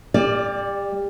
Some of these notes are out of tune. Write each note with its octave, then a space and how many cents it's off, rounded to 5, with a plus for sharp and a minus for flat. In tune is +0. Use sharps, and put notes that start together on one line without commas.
G3 +30 D5 +0